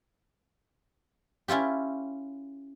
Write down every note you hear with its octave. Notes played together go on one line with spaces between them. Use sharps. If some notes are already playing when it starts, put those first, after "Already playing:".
C#4 E4 F4 G4